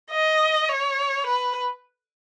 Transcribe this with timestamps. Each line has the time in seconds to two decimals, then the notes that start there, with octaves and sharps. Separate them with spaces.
0.11 D#5
0.69 C#5
1.26 B4